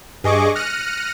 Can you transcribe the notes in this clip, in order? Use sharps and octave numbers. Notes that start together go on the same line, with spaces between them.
G2 G#4 D#5 C#6 D6
F6 F#6 A#6 C#7 D#7